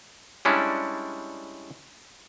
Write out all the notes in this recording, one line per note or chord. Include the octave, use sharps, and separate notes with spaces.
G3 G#3 C#4 D4 E4